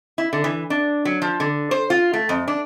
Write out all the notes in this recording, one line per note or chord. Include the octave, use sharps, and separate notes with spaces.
E4
D3
E3
D4
F#3
F3
D3
C5
F4
A3
F2
D4